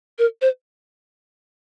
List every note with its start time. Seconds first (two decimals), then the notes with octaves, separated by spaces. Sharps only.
0.19 A#4
0.42 C5